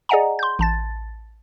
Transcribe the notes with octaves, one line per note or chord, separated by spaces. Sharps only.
G#4 D5 D#5 F#5 G#5 A#5
C6 G6
A1 A5 A6